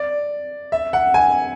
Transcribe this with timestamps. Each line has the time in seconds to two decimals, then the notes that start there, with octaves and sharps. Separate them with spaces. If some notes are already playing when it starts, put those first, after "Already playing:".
Already playing: D5
0.72 E5
0.93 F#5
1.14 G#5